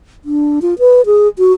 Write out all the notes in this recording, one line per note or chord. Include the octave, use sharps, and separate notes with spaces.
D4
F4
B4
G#4
F#4